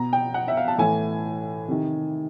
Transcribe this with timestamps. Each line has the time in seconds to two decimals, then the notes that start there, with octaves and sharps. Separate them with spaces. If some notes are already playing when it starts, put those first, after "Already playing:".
Already playing: B2 A#5
0.13 G5
0.34 F#5
0.48 E5
0.57 F5
0.68 A5
0.78 A2 E3 G#5
1.68 C3 D#3